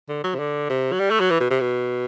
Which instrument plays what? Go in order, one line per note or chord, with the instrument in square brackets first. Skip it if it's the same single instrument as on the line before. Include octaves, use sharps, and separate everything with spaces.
[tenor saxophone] D3
F#3
C3
D3
C3
F#3
G3
A3
F#3
E3
B2
C3
B2